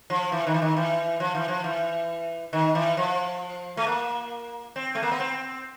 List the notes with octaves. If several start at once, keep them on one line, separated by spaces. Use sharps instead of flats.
F3
E3
D#3
E3
D#3
E3
F3
E3
F3
E3
D#3
E3
F3
A3
A#3
C4
A3
A#3
B3
C4